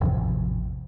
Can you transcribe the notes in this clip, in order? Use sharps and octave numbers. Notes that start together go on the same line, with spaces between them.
A1 E2 C3 F3